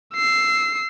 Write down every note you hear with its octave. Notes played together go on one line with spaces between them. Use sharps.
E6 C7